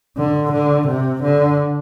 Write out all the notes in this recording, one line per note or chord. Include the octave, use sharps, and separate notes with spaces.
D3
D3
C3
D3